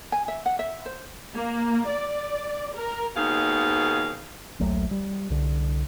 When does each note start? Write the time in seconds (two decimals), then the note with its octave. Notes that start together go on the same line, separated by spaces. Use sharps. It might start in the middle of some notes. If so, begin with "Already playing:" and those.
0.12 G#5
0.28 E5
0.46 F#5
0.59 E5
0.86 C5
1.34 A#3
1.88 D5
2.75 A#4
3.15 D#2 B2 G#4 F5
4.60 D#1 A#1 F#3 A3
4.91 G3
5.30 C2 D3